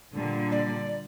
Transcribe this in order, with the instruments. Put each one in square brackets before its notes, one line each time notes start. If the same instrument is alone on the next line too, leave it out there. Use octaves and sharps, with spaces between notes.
[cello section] A#2 D3 G3
[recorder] D5